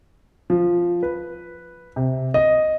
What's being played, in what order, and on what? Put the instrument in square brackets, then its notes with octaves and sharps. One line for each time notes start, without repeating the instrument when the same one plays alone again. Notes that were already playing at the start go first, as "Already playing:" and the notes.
[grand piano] F3
B4
C3
D#5